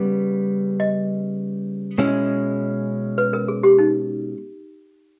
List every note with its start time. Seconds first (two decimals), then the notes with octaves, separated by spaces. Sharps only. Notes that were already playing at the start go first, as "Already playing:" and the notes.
Already playing: C#3 G3 B3
0.80 D#5
1.98 B2 G#3 C#4 E4
3.18 B4
3.33 A#4
3.48 G#4
3.63 G4
3.79 D#4